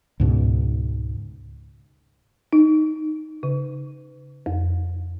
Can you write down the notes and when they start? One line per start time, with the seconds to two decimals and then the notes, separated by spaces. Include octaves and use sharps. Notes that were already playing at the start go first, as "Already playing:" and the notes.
0.20 C#2 G#2 B2
2.53 D#4
3.43 C#3
4.46 F2